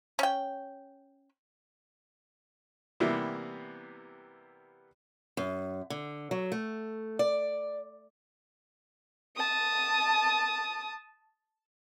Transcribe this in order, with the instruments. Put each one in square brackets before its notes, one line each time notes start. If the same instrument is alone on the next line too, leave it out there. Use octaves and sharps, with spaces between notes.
[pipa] C#4 G5
[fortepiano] C3 E3 G3 A#3 B3 E4
[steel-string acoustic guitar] F#2
D3
F#3
A3
D5
[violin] A5 D#6